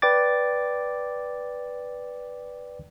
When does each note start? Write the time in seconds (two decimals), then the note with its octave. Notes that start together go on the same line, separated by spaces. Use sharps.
0.02 B4 D5 G5 D6 A6